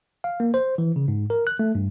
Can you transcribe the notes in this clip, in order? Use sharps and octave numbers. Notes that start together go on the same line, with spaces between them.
F5
A#3
C5
E3
C#3
G#2
A#4
F#6
A3
G2